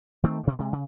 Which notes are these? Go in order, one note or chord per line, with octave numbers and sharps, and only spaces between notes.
D#3 A3 C4
G2 B2
C3 G#3
C#3